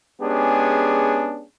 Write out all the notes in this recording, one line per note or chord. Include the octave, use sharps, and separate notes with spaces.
G#3 B3 C#4 D4 G4 G#4